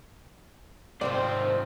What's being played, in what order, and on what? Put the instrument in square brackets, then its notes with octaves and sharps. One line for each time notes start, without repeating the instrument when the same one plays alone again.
[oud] G#2 C3 F3 [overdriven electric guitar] D#3 F4 [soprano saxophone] C4 [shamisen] D5